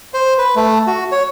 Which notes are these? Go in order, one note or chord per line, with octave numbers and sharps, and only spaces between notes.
C5
B4
A3
F#4
C#5